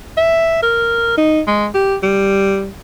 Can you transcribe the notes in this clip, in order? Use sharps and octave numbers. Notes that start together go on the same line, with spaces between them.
E5
A#4
D#4
G#3
G4
G3